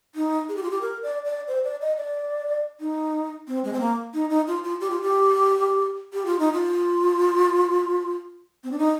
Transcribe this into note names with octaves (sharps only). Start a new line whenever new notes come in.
D#4
G#4
G4
F4
G4
A#4
D5
D5
C5
D5
D#5
D5
D#4
C4
G#3
C4
A#3
D#4
D#4
F4
F4
G4
F4
G4
G4
F4
D#4
F4
C4
D4
D#4